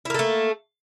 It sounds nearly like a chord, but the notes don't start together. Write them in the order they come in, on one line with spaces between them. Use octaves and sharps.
E4 A#3 A4 A3